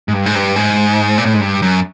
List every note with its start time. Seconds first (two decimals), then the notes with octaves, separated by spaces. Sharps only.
0.08 G#2
0.13 G2
0.26 G#2
0.35 G2
0.56 G#2
1.18 A#2
1.25 A2
1.34 G#2
1.41 G2
1.62 F#2